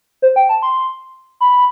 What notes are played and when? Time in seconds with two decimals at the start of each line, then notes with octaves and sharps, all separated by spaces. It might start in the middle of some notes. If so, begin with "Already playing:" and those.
0.22 C5
0.36 G5
0.49 A5
0.63 C6
1.41 B5